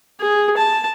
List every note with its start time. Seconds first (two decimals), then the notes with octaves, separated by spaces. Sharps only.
0.20 G#4
0.57 A5